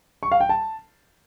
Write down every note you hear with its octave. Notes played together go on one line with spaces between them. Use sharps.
C#6
F5
G5
A5